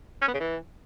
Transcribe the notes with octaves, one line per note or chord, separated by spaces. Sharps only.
C#4
B3
C#3
E3